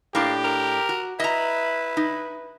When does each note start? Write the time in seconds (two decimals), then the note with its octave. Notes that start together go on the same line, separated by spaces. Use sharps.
0.15 A2 A#3 D4 G4
0.44 A#4
0.89 F#4
1.20 E4 B4 D#5 A#5
1.97 D#4